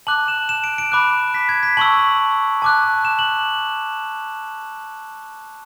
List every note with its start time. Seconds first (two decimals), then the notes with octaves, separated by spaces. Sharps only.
0.07 A5 D6 F#6 F#7
0.28 E7
0.49 E7
0.64 D7
0.78 D7
0.92 B5 D6 F#6
1.34 B6
1.49 G#6
1.63 B6
1.77 A5 C#6 E6 F#7
2.62 A5 D6 F#6
3.05 E7
3.19 F#7